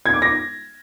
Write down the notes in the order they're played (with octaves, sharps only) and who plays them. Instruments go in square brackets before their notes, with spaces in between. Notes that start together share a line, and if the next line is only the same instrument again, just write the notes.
[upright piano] G#6
D6
A#6